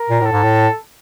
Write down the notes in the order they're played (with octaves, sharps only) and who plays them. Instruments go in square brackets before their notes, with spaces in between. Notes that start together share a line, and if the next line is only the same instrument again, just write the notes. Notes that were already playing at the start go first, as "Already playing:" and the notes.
Already playing: [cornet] A#4
[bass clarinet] A#2
[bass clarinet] A2 [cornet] A4
[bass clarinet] G#2
A2